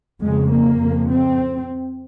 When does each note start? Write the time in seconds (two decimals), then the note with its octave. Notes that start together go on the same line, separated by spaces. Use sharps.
0.21 F2 C#3 G#3
0.49 A#3
0.78 F2 C#3
1.08 C4